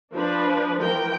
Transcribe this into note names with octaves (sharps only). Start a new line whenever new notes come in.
F3 D4 B4
E3 F3 A#4 G5